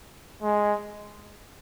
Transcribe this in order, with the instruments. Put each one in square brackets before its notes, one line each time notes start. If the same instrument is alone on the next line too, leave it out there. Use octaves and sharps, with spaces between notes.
[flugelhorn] G#3